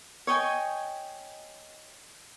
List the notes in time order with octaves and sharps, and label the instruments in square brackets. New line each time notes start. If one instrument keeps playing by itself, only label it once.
[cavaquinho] C#5 D#5 G5 G#5